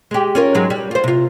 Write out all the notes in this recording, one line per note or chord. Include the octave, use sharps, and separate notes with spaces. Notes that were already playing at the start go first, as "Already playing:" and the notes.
G#3 G4
C#4 F4 A#4
G#2 F#3 G#3
G3
F4 C5
C3 F4